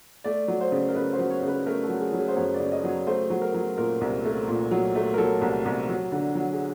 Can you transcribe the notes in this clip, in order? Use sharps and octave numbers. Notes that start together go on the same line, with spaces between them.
A3 D5
F#3
C5
C#3
A#4
C#3 B4
C5
F#3
C#5
C#3
B4
A3 A#4
A4
F#3
G#4
F#3
G#4
C5
F#2 C#5
D5
C#3
D#5
F#3
C#5
A3 C5
F#3
A#4
F#3
A#2 A#4
C2
A3
A#2
F#3
A3
A#4
F#3 A4
C2
C2
F#3
D3
F#3
G#4